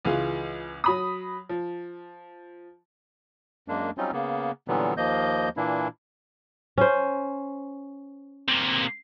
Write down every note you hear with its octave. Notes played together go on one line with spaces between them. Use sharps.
C#2 E3 F4 G#4
F#3 B5 D#6
F3
F#2 G#3 A#3 D4
F#3 G3 C4 C#4 D#4 F4
C#3 A#3 B3
A#2 D3 E3 F#3 G3 B3
D#2 F3 A#3 D#5 G6
A#2 E3 A#3 D4 E4
C#4 C5
C3 A#3